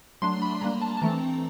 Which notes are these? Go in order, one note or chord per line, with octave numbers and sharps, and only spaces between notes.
F#3 A3 D4 C6
B5
G3 A#3 D4 A#5
A5
A5
E3 A3 C4 A#5